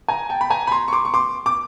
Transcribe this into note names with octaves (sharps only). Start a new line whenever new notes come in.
G#5 A#5
G5 A5
B5
G#5 A#5
B5
A#5 C6
C#6
C6 D6
C#6
C6 D6
D6